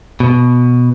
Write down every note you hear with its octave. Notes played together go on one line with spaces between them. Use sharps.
B2